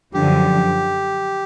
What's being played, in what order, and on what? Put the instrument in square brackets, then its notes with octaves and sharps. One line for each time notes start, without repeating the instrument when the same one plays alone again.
[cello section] F#2 D3 F3 [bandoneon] G4